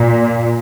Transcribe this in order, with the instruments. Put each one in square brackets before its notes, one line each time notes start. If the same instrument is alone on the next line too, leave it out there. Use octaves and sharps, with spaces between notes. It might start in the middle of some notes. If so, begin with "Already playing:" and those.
Already playing: [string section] A#2